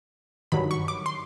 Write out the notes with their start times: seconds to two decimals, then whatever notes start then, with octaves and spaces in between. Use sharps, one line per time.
0.52 G2 D#3 F#3 B5
0.71 C#6
0.88 D6
1.06 C6